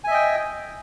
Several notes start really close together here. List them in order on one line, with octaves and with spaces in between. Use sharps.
G#5 E5 D#5 G5